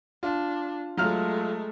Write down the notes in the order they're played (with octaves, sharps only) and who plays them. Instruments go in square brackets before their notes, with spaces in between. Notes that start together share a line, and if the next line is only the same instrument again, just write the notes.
[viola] D4 [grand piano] F4
[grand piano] F#3 F4 F6 [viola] G#3 A3